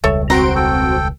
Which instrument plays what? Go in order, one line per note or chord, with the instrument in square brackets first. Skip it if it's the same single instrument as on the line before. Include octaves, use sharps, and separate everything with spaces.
[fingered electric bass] E1 C#2 G3 [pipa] A4 C#5 E5
[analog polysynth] C4 F#4 D7 [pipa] A#5 [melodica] C6
[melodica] A4 G5